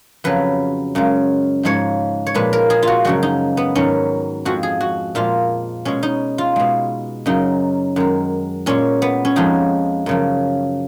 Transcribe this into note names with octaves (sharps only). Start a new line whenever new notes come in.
F2 C#3 F#3 B4
F#2 C#3 G#3
G#2 F3 G#3 C#5
C#5
A#2 F3 G#3 B4
A#4
G#4
F4 F#4
F#2 C#3 F3 G#3 F#4
D#4
B3
G#2 D#3 F#3 C#4
F2 F3 G#3 F#4
G#4
F#4
A#2 F3 G#3 F4
B2 G#3 C#4
D#4
F4
B2 G#3
F#2 C#3 F#3 D#4
F#2 D#3 G#3
A#2 G#3 C#4
B3
C#4
F2 F3 G#3 D#4
F#2 C#3 F3